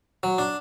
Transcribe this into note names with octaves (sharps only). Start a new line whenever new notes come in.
F#3
D4